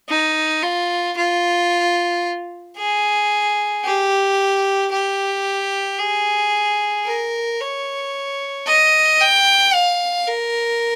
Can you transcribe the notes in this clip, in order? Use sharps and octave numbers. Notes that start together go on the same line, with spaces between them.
D#4
F4
F4
G#4
G4
G4
G#4
A#4
C#5
D#5
G5
F5
A#4